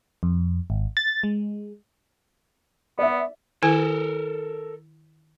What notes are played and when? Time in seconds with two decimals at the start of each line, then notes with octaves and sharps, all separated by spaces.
0.23 F2
0.70 G#1
0.97 A6
1.23 G#3
2.99 B3 D5 E5
3.63 D#3 E4 A4 A#4 G#5